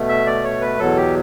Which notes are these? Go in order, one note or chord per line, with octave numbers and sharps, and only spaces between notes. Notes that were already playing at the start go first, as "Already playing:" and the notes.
Already playing: B2 A3
E5
D5
C#5
B4
E2 B2 F#3 A4
G4